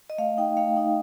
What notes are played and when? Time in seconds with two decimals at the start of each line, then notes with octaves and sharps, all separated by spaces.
0.10 D#5
0.18 A3 F5
0.38 D#4 G5
0.57 A3 F5
0.77 D#4